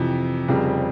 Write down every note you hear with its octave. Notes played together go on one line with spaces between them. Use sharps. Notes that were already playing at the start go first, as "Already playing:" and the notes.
Already playing: F2 C3 E3
F1 F2 C#3 G3 C4